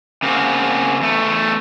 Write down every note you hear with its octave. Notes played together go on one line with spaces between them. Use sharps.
C#3 A#3 C4 F#4
E2 A3